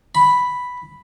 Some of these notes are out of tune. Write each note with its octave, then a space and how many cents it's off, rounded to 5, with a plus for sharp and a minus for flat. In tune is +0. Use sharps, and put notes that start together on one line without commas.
B5 +0